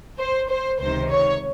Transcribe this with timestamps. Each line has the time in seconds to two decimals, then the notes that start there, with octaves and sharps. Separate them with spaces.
0.18 C5
0.49 C5
0.80 C#2 C3 D#3 C5
1.10 C#5